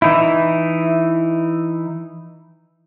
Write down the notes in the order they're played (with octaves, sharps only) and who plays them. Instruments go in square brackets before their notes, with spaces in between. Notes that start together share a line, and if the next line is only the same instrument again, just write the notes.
[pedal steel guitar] E3 D#4 E4